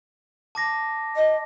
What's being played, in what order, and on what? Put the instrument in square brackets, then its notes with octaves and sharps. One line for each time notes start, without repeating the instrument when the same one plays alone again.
[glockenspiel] A5 D6 A#6
[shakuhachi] D#5